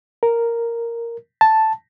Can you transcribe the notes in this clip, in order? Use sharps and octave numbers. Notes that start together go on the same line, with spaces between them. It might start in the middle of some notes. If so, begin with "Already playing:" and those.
A#4
A5